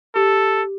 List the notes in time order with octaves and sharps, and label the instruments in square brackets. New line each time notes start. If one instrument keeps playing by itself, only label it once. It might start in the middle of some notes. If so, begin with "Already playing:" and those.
[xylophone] G4 [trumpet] A4